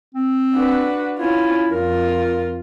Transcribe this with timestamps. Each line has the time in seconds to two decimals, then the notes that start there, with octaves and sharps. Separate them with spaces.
0.15 C4
0.54 D4 F#4 B4
1.17 C#4 E4 F4
1.71 F2 F4 A#4